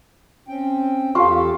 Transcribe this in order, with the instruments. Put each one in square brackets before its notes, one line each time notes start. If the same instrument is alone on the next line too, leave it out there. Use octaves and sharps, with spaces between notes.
[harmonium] C4 C#4 G5
[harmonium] E2 G4 A4 [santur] F4 [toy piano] F5 A5 C#6